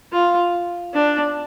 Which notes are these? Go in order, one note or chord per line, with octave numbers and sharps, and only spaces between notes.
F4
D4